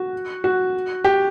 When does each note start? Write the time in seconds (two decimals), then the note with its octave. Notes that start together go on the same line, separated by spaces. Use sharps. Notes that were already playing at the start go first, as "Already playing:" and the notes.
Already playing: F#4
0.44 F#4
1.04 G4